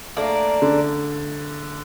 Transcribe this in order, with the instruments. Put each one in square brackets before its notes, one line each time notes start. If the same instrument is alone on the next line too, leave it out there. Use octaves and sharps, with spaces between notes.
[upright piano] A3 [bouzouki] A#3 D4
[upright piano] D3